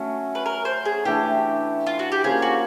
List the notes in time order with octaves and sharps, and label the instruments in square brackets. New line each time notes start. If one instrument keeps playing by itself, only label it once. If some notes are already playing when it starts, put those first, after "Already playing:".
Already playing: [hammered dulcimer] F#3 A3 C#4
[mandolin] B4
A#4
C5
G#4
[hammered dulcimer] E3 A3 D4 [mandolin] G4
[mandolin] F4
F#4
G4
[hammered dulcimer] F3 A#3 C#4 F4 [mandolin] G#4
[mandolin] F#4